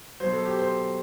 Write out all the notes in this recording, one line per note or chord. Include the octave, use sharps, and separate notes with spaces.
B2 F#3 C5
A4
G4
C5